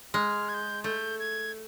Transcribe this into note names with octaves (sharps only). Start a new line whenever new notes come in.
G#3 F6
G#6
G6
A3 G6
G#6